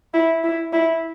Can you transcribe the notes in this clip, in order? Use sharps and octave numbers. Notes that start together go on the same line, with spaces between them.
E4
E4
E4